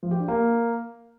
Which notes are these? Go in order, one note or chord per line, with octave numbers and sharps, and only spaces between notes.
F3
G4
D4
A#3